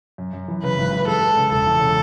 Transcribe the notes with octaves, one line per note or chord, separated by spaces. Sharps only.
F#2
F#2
E3
C#3 B4
G#1
E3
G#3 A4
G#3
C#3
E1 A4
E2
C#3